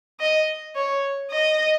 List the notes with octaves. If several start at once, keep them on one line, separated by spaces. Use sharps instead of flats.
D#5
C#5
D#5